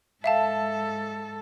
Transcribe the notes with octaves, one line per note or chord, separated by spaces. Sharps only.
G#2 A4 E5 F5 A5